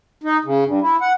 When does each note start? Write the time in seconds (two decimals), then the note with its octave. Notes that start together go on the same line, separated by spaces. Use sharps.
0.24 D#4
0.45 C#3
0.66 G2
0.82 E4
1.01 F#5